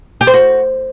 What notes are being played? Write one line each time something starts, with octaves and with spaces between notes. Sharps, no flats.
G4
C5
F#4